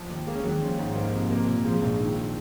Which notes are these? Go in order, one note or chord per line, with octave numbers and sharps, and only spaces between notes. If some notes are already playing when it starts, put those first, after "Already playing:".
Already playing: F3
D#2
G#3 A#3
C#4
D#2 F#3
D#3
F3 C#4
G#2
A#3
C3
A#3
A#2
F3 G#3
A#1 F3
D#3